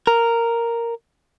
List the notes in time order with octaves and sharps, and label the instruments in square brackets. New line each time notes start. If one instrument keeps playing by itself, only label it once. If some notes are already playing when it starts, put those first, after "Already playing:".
[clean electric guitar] A#4